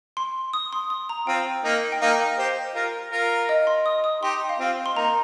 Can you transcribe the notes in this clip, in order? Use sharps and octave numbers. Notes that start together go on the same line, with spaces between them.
C6
D#6
C6
D#6
A#5
C4 F4 G5
A#3 D#4
G5
A#3 D#4 F5
G4 C5
F4 A#4
F4 A#4
D#5
C6
D#6
D#6
D#4 G4 C6
F5
C4 F4 G5
C6
A#3 D#4 A#5